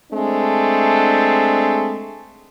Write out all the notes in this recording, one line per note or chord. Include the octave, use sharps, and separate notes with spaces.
G#3 A3 C4 D4